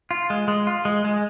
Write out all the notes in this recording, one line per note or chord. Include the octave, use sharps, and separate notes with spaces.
F4
G#3
G#3
F4
G#3
G#3